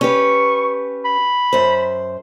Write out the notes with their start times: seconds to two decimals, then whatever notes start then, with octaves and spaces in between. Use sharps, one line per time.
0.01 C#4 G4 B4 C#6
1.05 B5
1.53 F#2 C5